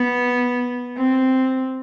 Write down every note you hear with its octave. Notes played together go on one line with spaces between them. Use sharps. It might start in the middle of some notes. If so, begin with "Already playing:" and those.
Already playing: B3
C4